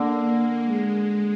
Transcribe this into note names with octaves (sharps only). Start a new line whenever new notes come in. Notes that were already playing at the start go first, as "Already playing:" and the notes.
Already playing: D3 A#3
G#3